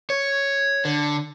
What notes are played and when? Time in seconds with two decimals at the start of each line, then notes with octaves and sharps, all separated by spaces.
0.10 C#5
0.85 D3